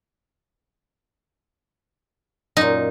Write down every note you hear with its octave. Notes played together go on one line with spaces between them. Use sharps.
F#2 A#2 D#4